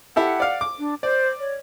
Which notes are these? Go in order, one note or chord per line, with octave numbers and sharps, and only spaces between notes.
E4 G4 A4 F#5
D5 F5
D6
D4
C5 D5
C#5